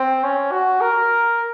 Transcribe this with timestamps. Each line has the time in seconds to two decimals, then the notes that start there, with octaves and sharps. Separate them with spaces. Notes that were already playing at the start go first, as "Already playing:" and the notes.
Already playing: C4
0.24 C#4
0.51 F#4
0.81 A#4